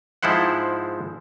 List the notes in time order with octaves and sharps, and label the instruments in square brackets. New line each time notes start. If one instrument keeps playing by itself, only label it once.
[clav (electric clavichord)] G#2 F3 G#3 E4 C5 F#5